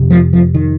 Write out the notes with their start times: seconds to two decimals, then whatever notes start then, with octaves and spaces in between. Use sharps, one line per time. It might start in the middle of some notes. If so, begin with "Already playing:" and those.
Already playing: F2 C3
0.10 F3
0.33 F3
0.54 D#3